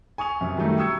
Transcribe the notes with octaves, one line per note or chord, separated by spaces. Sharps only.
G#5 C#6 D#6 F7
F#2 C3
D#3 F#3 G3 A3 D#4
G5 C#6 D#6 E6 G#6 C#7